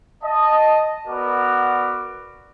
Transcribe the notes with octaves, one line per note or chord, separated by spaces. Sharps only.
D#5 A5
B3 F#4 A#4 B4 D5 D6